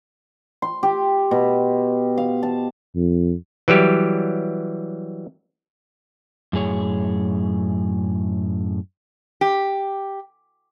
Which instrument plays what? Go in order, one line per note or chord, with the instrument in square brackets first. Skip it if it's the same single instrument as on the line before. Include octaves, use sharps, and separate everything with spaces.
[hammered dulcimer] C6
G4
B2
F5
A5
[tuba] F2
[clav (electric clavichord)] E3 F#3 G3 G4
[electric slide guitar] F#2 A2 G#4 C#5
[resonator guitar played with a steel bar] G4